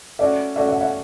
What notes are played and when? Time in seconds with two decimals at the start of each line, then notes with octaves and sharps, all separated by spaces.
0.19 A3 C#4 F#4 D5 E5
0.56 A3 C#4 F#4 D5 E5
0.68 E5 F#5
0.81 E5 F#5